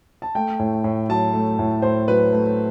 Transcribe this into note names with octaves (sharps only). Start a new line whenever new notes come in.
A5
A3 G5
A2
A2
F#3 A5
A3
A2
A2 C5
F#3 B4
A3